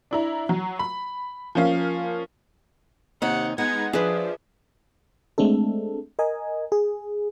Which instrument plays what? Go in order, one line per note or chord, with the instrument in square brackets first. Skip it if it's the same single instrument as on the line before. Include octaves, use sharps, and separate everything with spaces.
[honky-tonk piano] D4 E4 A#5
F#3
B5
F3 A#3 C#4 F5
[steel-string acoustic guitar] D#2 C3 D#4 [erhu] F#5
[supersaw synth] G#3 B3 D#4 [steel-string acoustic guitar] F#5 [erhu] G#6
[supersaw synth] F3 [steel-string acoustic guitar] D4 [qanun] G#4 B4 [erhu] E5
[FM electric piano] G#3 A3 C4 D4 A4
A#4 D#5 G#5
G#4